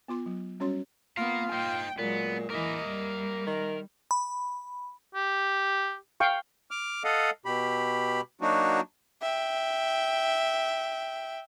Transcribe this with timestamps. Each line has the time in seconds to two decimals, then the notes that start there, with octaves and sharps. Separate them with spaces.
0.08 B3 F4 C6 D6
0.26 F#3
0.60 G3 C#4 F#4 C#5 C6
1.18 A#3 B3 F4 F5 A#5
1.53 D#4 C5 G5
1.99 A#2 F#3 G#3 B3
2.50 E3 A#3 A#4 D#5 E5
2.88 G3
3.47 D#3
4.11 B5
5.15 G4
6.20 F5 G5 C#6
6.71 D6 F6
7.04 A4 D#5 F5 F#5
7.45 B2 G4 B5
8.41 F#3 A#3 D4 D#4 F#4
9.22 E5 G5